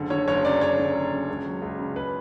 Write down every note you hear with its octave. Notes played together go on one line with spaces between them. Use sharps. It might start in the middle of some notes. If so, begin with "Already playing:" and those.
Already playing: F#1 D3
D3 C#5
F#1 C#5
F#2 D5
F#1 C#5
D3
F#1
F#2
C#2
F#3
C#2
C#3
C#2 B4